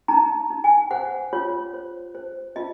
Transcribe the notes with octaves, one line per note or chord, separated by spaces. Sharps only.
D#4 A#5
D#4
G#5
C5 F#5
F4 C#5
C5
C5
F4 D#5